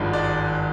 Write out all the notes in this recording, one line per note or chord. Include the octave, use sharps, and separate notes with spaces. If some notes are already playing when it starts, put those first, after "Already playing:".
Already playing: G#1 G2 F3 G#3
D5